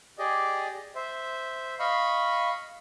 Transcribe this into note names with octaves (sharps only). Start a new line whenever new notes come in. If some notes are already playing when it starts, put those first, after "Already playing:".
G4 G#4 D5 D#5
C5 E5
D#5 F5 B5 C#6